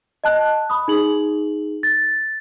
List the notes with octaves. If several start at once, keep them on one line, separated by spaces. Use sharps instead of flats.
D#5 A5 F#6
B5 D#6
D#4 G#4 F#7
A6